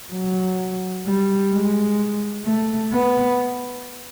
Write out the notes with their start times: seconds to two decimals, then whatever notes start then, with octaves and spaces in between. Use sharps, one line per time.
0.12 F#3
1.06 G3
1.52 G#3
2.45 A3
2.92 B3